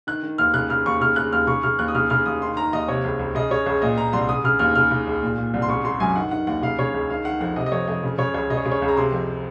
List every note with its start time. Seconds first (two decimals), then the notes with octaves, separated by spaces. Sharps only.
0.07 D#3 F#6
0.23 D#3
0.38 D#2 F6
0.54 C#3 F#6
0.70 C#3 F6
0.86 D#2 C#6
1.01 C#3 F6
1.16 C#3 F#6
1.32 D#2 F6
1.47 C#3 C#6
1.63 C#3 F6
1.79 D#2 F#6
1.88 D#6
1.95 C#3 F6
2.10 C#3 F6
2.26 D#2 D#6
2.41 D#3 C6
2.57 D#3 A#5
2.73 D#2 D#5
2.88 C3 C#5
3.04 C#2
3.19 C#2
3.35 C#3 D#5
3.51 C#3 C#5
3.66 C#2 C#5
3.82 A#2 D#5
3.98 A#2 A#5
4.13 C2 C6
4.29 C#3 D#6
4.44 C#3 F6
4.59 D#2 F6
4.75 C#3 F6
4.91 C#3
5.07 C#2
5.23 A#2
5.38 A#2
5.54 C2
5.62 C6
5.69 C#3 C#6
5.85 C#3 C6
6.00 F#2 G#5
6.16 D#3 F#5
6.31 D#3 F#5
6.47 D#2 F#5
6.62 C#3 F5
6.79 C#3 C#5
6.94 C#2
7.10 D#3 F5
7.25 D#3 F#5
7.40 F2 F#5
7.56 C3 D#5
7.66 D#5
7.72 F2 C#5
7.88 F2 D#5
8.04 C#3
8.18 C#3 C#5
8.34 C#2 C#5
8.50 C#3 D#5
8.57 C#5
8.66 C#3
8.71 C#5
8.82 C#2
8.88 A#5
8.97 C3 C6
9.12 F2